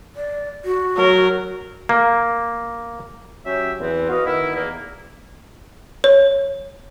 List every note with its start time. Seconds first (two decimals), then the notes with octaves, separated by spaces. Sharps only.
0.16 D5
0.65 F#4
0.97 F#3 A#4
1.89 A#3
3.45 F#3 C#4 G4 E5
3.80 E2 E3 B3 C4
4.10 F#4 B4 D#5 F5
4.25 D#3 B3 E4
4.54 E2 A#3
6.04 C#5